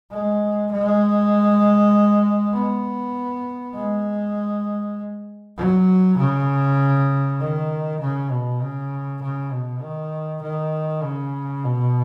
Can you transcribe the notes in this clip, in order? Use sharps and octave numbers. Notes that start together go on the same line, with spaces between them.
G#3
G#3
B3
G#3
F#3
C#3
D#3
C#3
B2
C#3
C#3
B2
D#3
D#3
C#3
B2